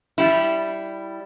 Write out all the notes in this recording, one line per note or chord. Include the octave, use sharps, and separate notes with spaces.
G3 E4